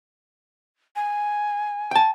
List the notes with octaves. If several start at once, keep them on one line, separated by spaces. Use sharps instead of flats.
G#5
G5 A5